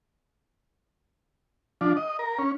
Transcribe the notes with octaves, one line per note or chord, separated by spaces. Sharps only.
F3 D4
D#5
A#4
C#4